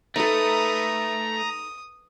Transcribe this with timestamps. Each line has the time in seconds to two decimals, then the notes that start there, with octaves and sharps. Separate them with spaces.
0.16 A3 D#4 A4 B4 A#5 D#6
1.37 D#6